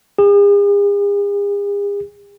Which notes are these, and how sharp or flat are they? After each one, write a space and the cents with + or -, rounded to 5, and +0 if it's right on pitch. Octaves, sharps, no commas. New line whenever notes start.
G#4 -45